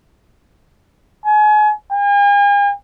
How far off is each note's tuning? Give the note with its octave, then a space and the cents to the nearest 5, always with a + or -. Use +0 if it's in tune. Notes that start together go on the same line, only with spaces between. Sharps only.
G#5 +35
G#5 -45